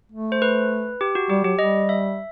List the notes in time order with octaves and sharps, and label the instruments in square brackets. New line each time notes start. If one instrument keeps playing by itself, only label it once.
[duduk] A3
[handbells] C5
B4
G4
F#4
[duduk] G3 [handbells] G4
[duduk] F#3 [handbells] G4
[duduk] G3 [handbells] D#5
[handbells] E5